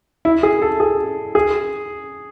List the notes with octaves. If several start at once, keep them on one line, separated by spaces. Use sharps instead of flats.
E4
G#4
A4
G#4
G#4